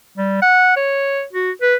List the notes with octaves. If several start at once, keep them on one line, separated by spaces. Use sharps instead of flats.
G3
F#5
C#5
F#4
B4